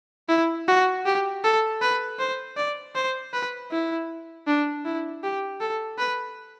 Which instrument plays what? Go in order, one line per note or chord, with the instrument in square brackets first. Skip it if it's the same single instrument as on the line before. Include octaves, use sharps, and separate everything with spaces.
[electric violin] E4
F#4
G4
A4
B4
C5
D5
C5
B4
E4
D4
E4
G4
A4
B4